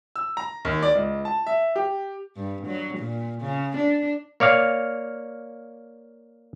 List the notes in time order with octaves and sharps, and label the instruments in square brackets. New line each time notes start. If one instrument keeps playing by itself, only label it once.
[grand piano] E6
A#5
D#2
D5
C#2
A5
E5
G4
[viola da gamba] G2
F#3
A#2
C#3
D4
[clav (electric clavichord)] A#3 C#5 D5 F5